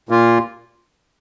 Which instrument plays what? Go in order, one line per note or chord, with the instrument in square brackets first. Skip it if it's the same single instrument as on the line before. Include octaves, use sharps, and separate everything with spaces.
[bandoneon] A#2 A#3 F4